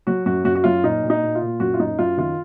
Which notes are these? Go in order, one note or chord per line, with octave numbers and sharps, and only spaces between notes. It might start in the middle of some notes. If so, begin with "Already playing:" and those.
F#3 F#4
F#2 F#4
F#2 F#4
F#4
F#3 F4
A#2 D#4
A#2
D#4
A#2
F4
A#2
F#2 F#4
F4
F#2 D#4
F#2 F4
D#3 F4